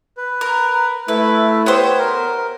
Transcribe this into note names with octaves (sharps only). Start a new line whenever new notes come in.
B4
A#4
A3 E4 B4
B3 G4 C5 C#5
A#4